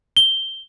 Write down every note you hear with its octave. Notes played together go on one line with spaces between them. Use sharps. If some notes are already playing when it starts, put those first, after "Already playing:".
G7